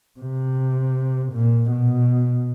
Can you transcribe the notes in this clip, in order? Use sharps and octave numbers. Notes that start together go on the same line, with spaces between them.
C3
A#2
B2